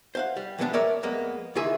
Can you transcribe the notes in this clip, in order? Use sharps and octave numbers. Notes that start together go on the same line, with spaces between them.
C5 F5 F#5
G3
E3 G#3 B3 C#4 D4 G4
A#4 C#5 D5 E5
F2 G#3 A#3 B3
C#2 D#3 E3 F4 G#4 E5